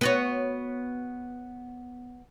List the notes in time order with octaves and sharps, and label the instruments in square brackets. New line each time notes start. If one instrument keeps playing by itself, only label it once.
[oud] B3 F#4 C#5